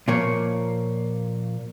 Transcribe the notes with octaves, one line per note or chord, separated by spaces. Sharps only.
A#2 F3 A#3 C#5